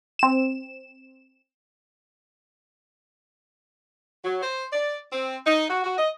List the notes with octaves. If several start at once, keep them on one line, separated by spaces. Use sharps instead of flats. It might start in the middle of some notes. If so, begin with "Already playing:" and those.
C4 E7
F#3
C5
D5
C4
D#4
F#4
F#4
D#5